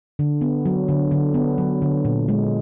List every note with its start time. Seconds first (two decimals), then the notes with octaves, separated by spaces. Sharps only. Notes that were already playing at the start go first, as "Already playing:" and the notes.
0.19 D3
0.41 B3
0.66 F#3
0.88 D3
1.11 D3
1.34 B3
1.58 F#3
1.82 D3
2.05 A#2
2.29 G#3